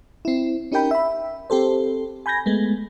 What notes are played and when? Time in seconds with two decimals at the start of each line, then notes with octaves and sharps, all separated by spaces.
0.25 C4 E4
0.72 C#4 D#4 G4 A#4 G5 B5
0.91 E5 B5
1.50 C4 G4 A4 C5
2.26 G#5 B5 G6 G#6 A#6
2.46 G#3 A3 B3